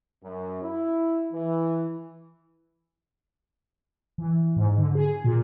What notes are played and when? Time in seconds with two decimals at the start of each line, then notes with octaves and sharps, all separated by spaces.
0.24 F#2
0.62 E4
1.33 E3
4.18 E3
4.56 G#2
4.78 D3
4.95 G#4
5.24 A#2